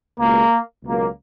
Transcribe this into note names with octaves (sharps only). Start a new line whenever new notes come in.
C#2 B2 G#3 A#3
C#2 B2 F#3 A#3